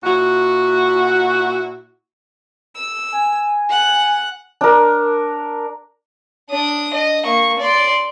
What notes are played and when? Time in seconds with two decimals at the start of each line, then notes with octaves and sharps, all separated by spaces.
0.03 A#2 E4 F#4
2.74 E6
3.12 G#5
3.69 F#5 F#6
4.61 D4 A#4
6.50 D4 D#6
6.94 D#5
7.24 A#3 C#6
7.59 D5 C6